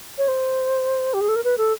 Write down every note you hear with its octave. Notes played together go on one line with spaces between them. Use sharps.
C#5
C5
G4
G#4
A4
A#4
B4
A4